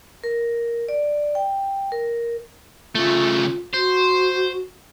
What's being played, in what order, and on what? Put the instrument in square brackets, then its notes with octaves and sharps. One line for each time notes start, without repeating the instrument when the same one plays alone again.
[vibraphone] A#4
D5
G5
A#4
[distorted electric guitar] C#3 A3 [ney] F4
[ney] F#4 [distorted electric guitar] C5